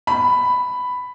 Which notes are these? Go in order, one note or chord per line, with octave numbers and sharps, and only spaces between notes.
B5